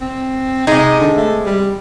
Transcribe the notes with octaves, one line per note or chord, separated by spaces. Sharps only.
C4
C3 G#3 D#4
D3
A3
G3